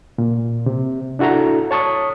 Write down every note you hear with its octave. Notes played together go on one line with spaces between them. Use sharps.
A#2
C3
D4 E4 F#4 A4 A#5
C#5 A5 C#6 D#6